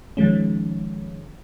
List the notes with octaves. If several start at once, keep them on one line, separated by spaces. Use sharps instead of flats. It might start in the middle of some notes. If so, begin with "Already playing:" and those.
D#3 F3 G#3 C#4